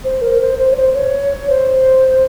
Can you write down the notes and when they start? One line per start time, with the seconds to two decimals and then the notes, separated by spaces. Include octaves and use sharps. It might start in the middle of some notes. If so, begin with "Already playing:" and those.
0.04 C5
0.22 A#4
0.41 C5
0.59 C5
0.72 C#5
0.77 C5
0.95 C#5
1.49 C5